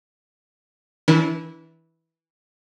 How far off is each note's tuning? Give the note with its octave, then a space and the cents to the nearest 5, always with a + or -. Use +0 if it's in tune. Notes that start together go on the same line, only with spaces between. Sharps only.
E3 -15 D4 -40 A#4 +40